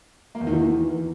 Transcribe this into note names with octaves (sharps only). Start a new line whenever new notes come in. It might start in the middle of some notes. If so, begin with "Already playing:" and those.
A#3
E2
D#3
E3